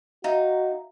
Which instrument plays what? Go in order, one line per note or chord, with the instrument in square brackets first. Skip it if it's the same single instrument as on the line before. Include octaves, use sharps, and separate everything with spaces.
[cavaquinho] D#4 [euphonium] F#4 [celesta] E5 F5 A#5